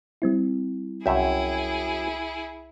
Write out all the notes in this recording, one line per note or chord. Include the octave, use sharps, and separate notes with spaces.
G3 C4 E4
C2 F#2 E4 G#4 E5 G5